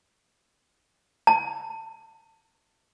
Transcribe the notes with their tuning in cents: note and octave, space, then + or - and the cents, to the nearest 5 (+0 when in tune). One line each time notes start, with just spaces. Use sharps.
A5 +25